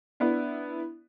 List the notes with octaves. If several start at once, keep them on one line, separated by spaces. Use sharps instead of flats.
B3 D4 E4